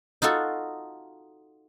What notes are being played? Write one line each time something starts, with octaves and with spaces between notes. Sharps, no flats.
D#4 F4 F#4 A4